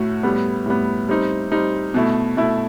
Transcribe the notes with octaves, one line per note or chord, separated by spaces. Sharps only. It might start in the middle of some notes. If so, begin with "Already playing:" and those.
Already playing: A2 A3 F#4
A2 G3 B3
A2 G3 B3
G3 C4 D#4
G3 C4 D#4
B2 A3 E4
B2 A3 E4